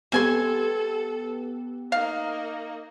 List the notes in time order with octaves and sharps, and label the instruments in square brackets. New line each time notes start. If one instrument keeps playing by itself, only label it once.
[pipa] G3 G#5 C6 [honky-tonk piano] B3 G4 [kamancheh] A4
[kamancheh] A#3 D#4 [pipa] F5